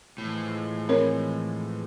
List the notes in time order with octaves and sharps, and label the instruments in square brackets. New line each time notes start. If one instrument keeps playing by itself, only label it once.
[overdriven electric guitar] A2 [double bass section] E3 F3 G#3
[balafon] C4 A#4 C#5